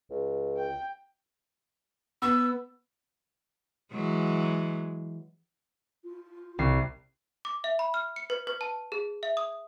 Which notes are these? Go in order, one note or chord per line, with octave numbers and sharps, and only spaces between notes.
C#2
G5
B3 E6
E3 F#3 G#3
F4
C2 C7
D6
E5
B5
F6
C#7
B4
B4
A5
G#4
E5
D#6